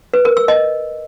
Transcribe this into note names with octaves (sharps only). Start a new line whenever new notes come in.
B4
A#4
E6
D#5